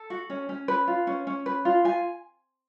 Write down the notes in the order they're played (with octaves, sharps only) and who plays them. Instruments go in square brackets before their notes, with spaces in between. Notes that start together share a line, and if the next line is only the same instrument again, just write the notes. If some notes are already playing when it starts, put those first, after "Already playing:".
Already playing: [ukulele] A4
F#4
C#4
C#4
B4
F4
C#4
C#4
B4
F4
F4 G#5